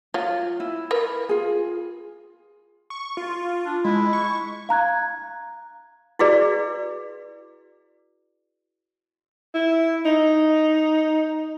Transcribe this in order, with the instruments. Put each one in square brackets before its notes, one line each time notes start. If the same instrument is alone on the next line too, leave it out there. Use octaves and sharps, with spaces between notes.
[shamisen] F#3 [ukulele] F4
[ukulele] E4
[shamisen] A#4 B4
[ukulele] F4 G#4
[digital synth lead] C#6
F4
[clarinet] D4
[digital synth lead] G#3 [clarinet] E4
[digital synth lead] C#6
[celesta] F5 A#5 F#6 G#6
[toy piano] E4 F#4 G#4 B4 D5
[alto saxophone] E4
D#4